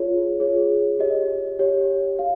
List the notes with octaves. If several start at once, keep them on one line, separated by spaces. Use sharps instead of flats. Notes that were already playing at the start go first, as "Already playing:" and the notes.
Already playing: F4 G#4 C#5
F4 G#4 C#5
G4 C#5 D#5
G4 C#5
G4 F5